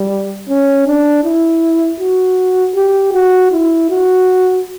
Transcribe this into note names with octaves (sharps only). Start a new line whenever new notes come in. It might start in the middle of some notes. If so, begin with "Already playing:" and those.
Already playing: G3
C#4
D4
E4
F#4
G4
F#4
E4
F#4